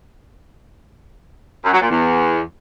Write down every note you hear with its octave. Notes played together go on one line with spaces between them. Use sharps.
F#2
F#3
A#2
E2